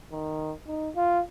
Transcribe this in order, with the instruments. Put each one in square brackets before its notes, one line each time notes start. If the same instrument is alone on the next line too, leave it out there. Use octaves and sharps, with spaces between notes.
[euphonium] D#3
D#4
F4